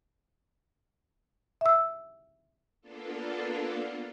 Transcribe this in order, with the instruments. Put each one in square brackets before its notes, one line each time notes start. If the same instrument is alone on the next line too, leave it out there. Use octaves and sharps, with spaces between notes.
[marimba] E5 E6
[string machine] A#3 B3 D4 F4 A4